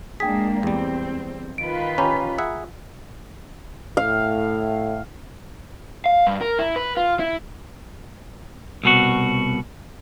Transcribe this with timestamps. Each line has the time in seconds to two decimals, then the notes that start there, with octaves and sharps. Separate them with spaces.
0.20 G#3 A#3 D4 G#4 G5 B6
0.63 E2 G3 C4
1.58 D#3 F4 B4 D7
1.98 C#4 G4 A#5 B5
2.38 G#4 E5 F#5
3.97 A2 F5
6.06 F5
6.27 G2
6.41 A#4
6.59 E4
6.76 B4
6.97 F4
7.19 E4
8.83 C2 B2 F#4